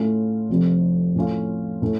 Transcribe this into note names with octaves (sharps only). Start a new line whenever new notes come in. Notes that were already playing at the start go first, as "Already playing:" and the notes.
Already playing: A2 A3 C#4 F4
F1 F2 C3 F3
A2 A3 C#4 F4
A2 A3 C#4